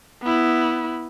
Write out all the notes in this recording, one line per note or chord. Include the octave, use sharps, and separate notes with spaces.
B3 E4